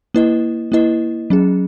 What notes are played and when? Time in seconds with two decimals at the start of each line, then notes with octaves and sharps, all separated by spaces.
0.14 A#3 E4 B4 D#5
0.72 A#3 E4 B4 D#5
1.30 F#3 C#4 G#4